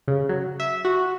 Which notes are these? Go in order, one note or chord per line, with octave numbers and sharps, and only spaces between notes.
C#3
F#3
E5
F#4